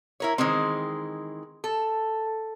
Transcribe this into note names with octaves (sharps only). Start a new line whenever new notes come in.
E4 A#4 C#5
D#3 E3 G#3 C4
A4